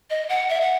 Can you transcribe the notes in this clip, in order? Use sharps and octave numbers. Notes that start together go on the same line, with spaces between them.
D#5
F#5
E5
F#5